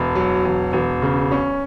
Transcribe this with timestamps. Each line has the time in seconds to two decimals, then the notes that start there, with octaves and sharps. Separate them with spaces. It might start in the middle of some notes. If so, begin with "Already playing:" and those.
Already playing: E1
0.15 F#3
0.45 E1
0.73 E1
1.02 C#3
1.32 C#4